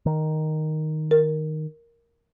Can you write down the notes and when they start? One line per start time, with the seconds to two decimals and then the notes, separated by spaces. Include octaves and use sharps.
0.06 D#3
1.11 A#4